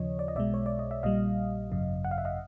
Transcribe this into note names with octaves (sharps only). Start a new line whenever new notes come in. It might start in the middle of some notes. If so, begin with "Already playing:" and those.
Already playing: D#2 C#3 F3 C#5 D#5
D5
D#5
B1 B2 G#3 D5 E5
C#5
D5
D#5
E5
A#1 A#2 G3 D#5 F5
G#1 F#2 C#3
F#5
F5
E5
D#5 F5